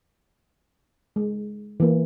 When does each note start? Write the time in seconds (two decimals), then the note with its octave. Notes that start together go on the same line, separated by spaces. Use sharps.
1.16 G#3
1.80 E3 A#3